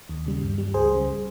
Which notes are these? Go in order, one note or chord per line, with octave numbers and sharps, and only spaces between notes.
D#2
C#3 G3
G2
G3
C#2 G#4 C5
C#3 G3